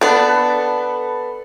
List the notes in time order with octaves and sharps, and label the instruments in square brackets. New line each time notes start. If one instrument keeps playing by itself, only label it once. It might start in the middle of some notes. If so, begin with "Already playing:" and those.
[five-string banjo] B3 D4 [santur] A4 B4